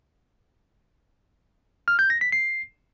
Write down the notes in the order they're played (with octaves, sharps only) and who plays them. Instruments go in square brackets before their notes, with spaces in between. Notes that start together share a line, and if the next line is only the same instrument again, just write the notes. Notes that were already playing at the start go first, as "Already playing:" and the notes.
[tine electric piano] F6
G6
A#6
B6
C7